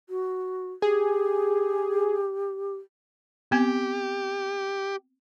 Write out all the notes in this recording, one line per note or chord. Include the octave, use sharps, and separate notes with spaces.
F#4
G4 G#4
B3 C4 G4